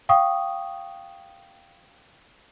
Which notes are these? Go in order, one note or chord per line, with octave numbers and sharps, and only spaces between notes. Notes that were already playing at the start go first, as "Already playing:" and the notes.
F5 G5 C#6 D#6